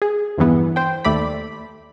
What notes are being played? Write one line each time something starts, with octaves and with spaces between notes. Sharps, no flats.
G#4
E2 G2 E3 B3
C5 G5
D#2 A3 D5 B5